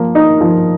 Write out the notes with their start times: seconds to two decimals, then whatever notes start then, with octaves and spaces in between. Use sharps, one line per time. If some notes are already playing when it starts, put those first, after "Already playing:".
Already playing: F3 A#3
0.15 D#4
0.41 F3